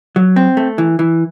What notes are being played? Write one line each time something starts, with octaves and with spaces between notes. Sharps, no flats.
F#3
C4
A3
E3
E3